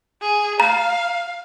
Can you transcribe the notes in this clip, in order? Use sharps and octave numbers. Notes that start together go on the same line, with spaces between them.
G#4
F5 A#5